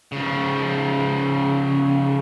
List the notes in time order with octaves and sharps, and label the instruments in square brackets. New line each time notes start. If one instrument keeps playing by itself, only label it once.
[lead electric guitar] C#3 F3